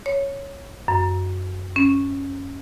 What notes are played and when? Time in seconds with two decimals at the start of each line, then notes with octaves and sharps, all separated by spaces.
0.06 C#5
0.88 F#2
1.76 C#4